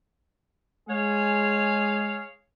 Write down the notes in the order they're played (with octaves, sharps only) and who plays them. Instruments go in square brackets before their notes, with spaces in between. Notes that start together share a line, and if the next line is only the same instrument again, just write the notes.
[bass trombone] G#3 [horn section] G#4 C#5 F5